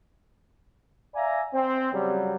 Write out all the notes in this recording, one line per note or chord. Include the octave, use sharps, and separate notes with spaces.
D5 E5 F5 G#5 A#5
C4
C#3 F#3 G3